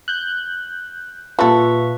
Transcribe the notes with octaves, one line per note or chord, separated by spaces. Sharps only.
F#6 G6
A#2 G3 F4 A4 B4 E5 C#6